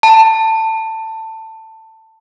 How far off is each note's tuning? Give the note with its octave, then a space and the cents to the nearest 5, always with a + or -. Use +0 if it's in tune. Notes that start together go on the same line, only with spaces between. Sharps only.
A5 +15